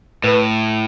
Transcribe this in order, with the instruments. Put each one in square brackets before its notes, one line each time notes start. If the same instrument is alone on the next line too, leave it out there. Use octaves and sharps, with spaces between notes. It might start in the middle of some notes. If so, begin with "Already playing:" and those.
[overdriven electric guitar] A2 [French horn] B4